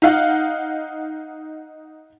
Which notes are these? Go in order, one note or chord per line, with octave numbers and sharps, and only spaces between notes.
D#4 F5 F#5